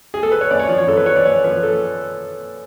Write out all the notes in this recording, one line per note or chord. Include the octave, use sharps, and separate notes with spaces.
G#4
A4
B4
C#5
F#2 D5
C#5
F3 D5
C#5
F#2 A4
B4
F3 C#5
D5
F#2 C#5
F3 B4
A4